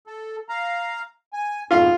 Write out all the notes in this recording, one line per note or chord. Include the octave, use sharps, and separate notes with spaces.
A4
F5 A#5
G#5
F2 G#2 B2 F4 F5